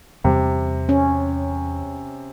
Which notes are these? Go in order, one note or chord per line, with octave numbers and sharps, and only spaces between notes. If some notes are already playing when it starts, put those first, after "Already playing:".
E2 C3 G3
C#4